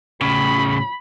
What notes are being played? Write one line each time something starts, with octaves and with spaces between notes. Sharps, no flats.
A2 C#3 B5